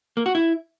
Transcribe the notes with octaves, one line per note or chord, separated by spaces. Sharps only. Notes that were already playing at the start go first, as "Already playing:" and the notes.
A#3
F#4
E4